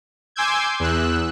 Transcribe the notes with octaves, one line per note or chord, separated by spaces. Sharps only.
G#5 C6 D6 E6 G6 G#6
E2 E6 F#6